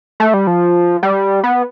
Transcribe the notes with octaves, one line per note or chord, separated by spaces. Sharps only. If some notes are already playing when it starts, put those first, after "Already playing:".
A3
G3
F3
G3
B3